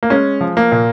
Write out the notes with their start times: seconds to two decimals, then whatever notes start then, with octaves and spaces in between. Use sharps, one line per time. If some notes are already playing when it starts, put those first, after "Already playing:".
0.03 A#3
0.10 G#3 C#4
0.41 F3
0.57 A#3
0.72 A#2